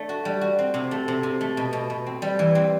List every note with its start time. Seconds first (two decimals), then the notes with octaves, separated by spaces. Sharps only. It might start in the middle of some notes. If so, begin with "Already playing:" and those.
Already playing: A3 D4
0.09 F#4
0.25 G3
0.41 F#4
0.59 C4
0.74 C3
0.91 A3
1.08 C3
1.23 C3
1.41 A3
1.57 B2
1.73 B2
1.90 B2
2.06 C4
2.22 G3
2.39 E3
2.55 C4